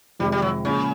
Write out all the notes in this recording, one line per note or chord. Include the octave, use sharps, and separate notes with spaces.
F2 C3 D#3 G3 G#3
G3
F#3
A#2 C#3 F3 G#3